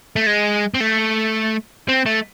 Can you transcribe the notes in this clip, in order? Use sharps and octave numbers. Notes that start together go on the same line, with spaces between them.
A3
G#3
C4
A3
C4
A3